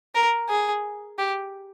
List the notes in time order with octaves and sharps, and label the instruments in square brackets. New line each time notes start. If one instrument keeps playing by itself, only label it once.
[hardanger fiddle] A#4
G#4
G4